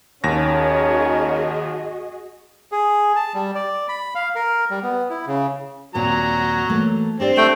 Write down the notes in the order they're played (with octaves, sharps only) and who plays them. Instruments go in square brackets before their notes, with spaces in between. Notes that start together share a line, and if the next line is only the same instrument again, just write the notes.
[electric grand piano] D#2 A#6 [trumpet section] C#4 A#4 C#5 [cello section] F#4 G#4 D#5
[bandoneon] G#4
A5
G3
D5
B5
F5
A#4
G3
B3
E4
C#3
[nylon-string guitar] D#2 A#2 C4 [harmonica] F#3 A#5
[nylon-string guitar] E3 A3 A#3
[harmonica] C4 [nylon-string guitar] D4 G4 D5
[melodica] A3 G5